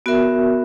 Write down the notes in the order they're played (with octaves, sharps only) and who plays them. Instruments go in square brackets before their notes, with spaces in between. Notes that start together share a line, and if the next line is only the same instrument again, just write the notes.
[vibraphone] B3 F#4 A#4 E5